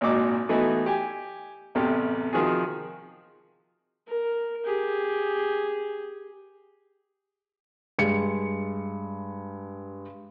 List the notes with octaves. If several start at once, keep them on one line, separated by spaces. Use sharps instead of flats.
G#1 A#2 D#4 F#4 D6
E3 A3 B3 D#4 E4 F#4
G4 G#5
A1 E2 C3 A3 G4
C3 D#3 F3 F#4 G#4
A#4
G4 G#4
G2 G#3 C#7